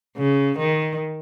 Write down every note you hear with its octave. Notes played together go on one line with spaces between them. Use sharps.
C#3
D#3